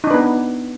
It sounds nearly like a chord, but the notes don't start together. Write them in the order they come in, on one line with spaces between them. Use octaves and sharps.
D#4 D4 B4 B3